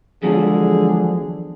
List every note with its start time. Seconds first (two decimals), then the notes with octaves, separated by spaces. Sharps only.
0.23 E2 D3 F3 F#3 G#3 G#4